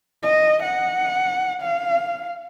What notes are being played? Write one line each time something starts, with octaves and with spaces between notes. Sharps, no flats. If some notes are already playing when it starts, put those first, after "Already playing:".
D#5
F#5
F5